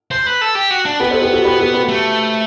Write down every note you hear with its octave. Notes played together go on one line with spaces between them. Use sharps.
C5
B4
A4
G4
F#4
D4
B3 G4 B4
A4 C5
G4 B4
F#4 A4
G4 B4
F#4 A4
G4 B4
A3